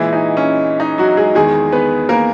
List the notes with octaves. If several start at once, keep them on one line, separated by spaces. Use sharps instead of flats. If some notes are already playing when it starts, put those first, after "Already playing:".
Already playing: A#2 E3 G#3 E4
D#4
C#4
D#4
F#3 F#4
G#3 G#4
E2 D#3 G#3 G#4
B3 B4
A#3 A#4